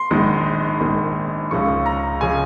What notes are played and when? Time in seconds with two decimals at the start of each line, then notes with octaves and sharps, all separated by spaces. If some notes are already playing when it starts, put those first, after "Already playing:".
Already playing: C6
0.11 A#1 G#2 D#3
0.81 A#1 G#2 D#3
1.51 C#2 C#3 F3 C#6
1.86 A#5
2.21 C#3 F3 G#5